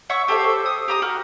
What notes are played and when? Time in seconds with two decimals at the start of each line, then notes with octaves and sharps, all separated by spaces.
0.09 C#5 E5 F#5 C#6
0.28 G4 A4 C5 E5
0.66 D#6
0.88 G4 A#5 D#6
1.02 F#4 G5 F6